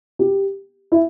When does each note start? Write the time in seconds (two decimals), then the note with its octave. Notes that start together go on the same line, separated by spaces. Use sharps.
0.19 G4
0.92 E4